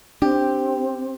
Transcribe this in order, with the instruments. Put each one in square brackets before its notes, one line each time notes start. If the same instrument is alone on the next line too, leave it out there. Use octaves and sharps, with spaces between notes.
[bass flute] C4 [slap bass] D4 [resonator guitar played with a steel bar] G4